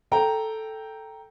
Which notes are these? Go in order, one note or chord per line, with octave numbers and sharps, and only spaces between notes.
A4 G5 A#5